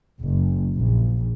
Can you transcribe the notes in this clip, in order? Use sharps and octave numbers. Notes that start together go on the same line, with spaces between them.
F#1
A#1